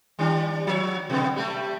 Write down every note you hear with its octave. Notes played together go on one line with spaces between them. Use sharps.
D#3 G3 D4
F3 C#5
B2 D3 B3
G3 A3